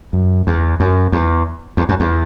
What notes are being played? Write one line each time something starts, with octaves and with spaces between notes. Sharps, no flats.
F#2
E2
F#2
E2
E2
F#2
E2